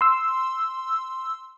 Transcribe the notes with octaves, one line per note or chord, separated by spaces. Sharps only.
C6 E6